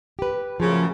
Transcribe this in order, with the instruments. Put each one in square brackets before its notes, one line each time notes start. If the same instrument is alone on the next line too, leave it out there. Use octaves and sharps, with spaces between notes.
[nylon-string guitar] G4 B4
[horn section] F#2 A2 C#3 [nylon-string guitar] F3